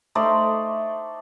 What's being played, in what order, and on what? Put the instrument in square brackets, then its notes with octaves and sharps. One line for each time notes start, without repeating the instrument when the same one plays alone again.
[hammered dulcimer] A3 D#4 C5 D5